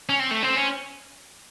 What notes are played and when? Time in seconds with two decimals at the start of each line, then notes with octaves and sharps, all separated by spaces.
0.09 C#4
0.20 C4
0.31 A3
0.43 C4
0.56 C#4